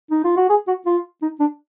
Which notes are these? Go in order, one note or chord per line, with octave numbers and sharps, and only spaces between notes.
D#4
F4
F#4
G#4
F#4
F4
D#4
D4